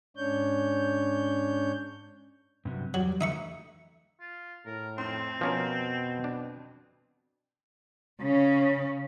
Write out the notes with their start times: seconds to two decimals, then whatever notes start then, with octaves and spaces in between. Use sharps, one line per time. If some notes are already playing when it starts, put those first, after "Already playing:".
0.17 G#2 C#4 D4 C#5 G6
2.65 G2 C3 F#3
2.94 E2 F#3 G3
3.21 D3 E3 A3 D#4 E5 C#6
4.21 F4
4.66 A2 A#4
4.98 F2 C4 C6
5.41 B2 F3 C#4 A#4
6.24 D4
8.21 C#3 C#4